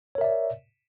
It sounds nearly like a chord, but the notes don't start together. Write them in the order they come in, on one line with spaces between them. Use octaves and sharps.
C#5 A#4 E5 D5